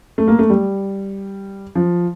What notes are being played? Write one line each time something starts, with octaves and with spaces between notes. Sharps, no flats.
A3
A#3
A3
G3
F3